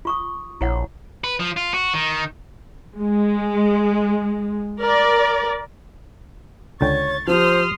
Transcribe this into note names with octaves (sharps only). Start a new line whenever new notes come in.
F4 C#6 D#6
A#1 E4 C#5 F#5
B4
F3
F4
F#4
D#3
G#3
A#4 D5
C#2 D3 C#5 G5 C#6 A6
F3 F4 G4 C5 C6 D#6 F6